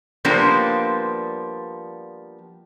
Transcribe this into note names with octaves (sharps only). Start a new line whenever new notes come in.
F3 G3 A#3 B3 D4 C5